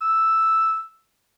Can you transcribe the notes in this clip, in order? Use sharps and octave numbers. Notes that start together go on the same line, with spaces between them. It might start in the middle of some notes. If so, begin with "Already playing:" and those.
E6